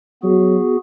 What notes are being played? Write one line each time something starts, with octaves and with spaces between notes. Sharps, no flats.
F#3 B3 F#4 G#4